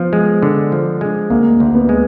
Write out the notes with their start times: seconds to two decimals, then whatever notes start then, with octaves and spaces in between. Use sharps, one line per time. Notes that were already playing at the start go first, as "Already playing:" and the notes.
Already playing: F3 B3
0.13 G#3
0.43 D3
0.72 F3
1.01 G#3
1.30 D2 A#3
1.60 D2
1.75 B3
1.89 G#3